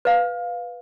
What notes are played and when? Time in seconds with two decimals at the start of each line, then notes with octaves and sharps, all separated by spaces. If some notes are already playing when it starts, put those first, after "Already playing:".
0.05 B4 F5